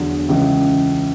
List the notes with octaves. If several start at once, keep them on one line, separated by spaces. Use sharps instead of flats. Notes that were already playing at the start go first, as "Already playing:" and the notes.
Already playing: E2 D3 F#3
C#2 C#3 E3